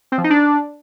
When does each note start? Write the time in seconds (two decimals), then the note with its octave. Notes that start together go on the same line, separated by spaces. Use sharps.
0.12 C4
0.18 F3
0.24 D#4
0.30 D4